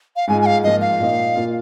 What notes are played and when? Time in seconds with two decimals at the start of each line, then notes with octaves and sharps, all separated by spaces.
0.16 F5
0.28 G#2 G#3 F4 G#5
0.42 G#5
0.46 F5
0.64 G#2 F3 A#3 F4 D#5
0.81 F5
1.00 A#2 A#3 D#4
1.36 A#2 A#3 F4